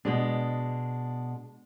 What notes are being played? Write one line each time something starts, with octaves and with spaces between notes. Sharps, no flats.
B2 G#3 D4